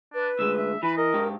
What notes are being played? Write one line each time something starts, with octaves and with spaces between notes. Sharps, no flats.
D4 B4
D2 G#3 E6
E5
E3 B4 B5
A#4 D#5
G#2 G4